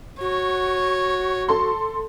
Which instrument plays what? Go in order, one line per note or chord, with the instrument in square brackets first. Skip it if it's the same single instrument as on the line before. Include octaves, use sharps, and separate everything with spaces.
[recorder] F#4 [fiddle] C#5
[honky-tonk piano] A4 C6